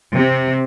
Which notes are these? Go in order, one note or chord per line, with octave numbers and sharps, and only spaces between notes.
C3